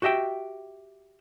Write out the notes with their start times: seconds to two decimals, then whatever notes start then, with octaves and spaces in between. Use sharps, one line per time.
0.02 F#4 G4 D#5 E5 G5